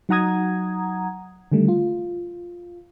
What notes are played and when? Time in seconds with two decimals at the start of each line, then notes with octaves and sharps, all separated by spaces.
0.09 F#3 D#4 F#5 A#5 D#6 G#6
1.52 D3 D#3 G3 A3
1.68 F4